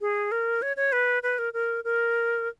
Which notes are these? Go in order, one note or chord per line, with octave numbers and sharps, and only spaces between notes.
G#4
A#4
C#5
C#5
B4
B4
A#4
A#4
A#4